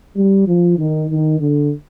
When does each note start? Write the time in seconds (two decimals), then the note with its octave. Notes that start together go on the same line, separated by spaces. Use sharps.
0.17 G3
0.47 F3
0.79 D#3
1.10 D#3
1.40 D3